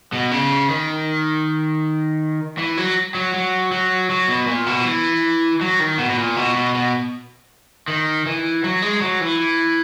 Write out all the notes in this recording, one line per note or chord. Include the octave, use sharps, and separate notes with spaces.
B2
C#3
D#3
E3
F#3
F#3
F#3
F#3
F#3
B2
A#2
B2
E3
F#3
D#3
B2
B2
A#2
B2
B2
B2
D#3
E3
F#3
G#3
F#3
E3